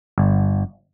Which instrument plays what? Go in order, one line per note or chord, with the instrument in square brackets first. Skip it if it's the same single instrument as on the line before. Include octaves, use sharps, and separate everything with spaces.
[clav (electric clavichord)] G1